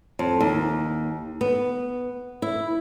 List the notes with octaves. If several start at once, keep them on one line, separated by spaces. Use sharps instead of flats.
F2
D#2
B3
E4